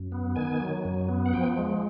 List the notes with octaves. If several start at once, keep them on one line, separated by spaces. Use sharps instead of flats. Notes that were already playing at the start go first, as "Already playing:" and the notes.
Already playing: F#2
B3
D#3 G#5
F#3
F#2
B3
F#5
F3 G5
G#3